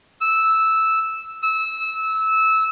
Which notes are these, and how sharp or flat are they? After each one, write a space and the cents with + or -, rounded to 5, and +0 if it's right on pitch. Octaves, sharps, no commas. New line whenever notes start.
E6 -10
E6 -20